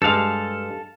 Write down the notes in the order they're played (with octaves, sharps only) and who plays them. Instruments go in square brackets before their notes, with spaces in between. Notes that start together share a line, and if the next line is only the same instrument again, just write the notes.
[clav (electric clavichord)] G2 G#3 [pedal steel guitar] A4 F5